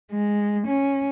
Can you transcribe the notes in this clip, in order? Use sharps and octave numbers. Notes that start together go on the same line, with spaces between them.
G#3
C#4